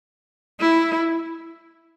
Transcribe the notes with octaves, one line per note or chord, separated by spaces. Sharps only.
E4